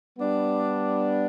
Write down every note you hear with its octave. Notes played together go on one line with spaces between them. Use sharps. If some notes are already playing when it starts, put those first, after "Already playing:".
G3 B3 D4